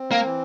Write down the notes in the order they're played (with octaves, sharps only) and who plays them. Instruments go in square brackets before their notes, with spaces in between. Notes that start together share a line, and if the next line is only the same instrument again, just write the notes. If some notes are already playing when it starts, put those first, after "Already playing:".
Already playing: [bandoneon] C4
[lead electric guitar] A#3
[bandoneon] E3